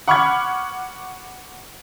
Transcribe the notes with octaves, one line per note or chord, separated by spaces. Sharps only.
F#5 B5 C#6 D6 F6 G#6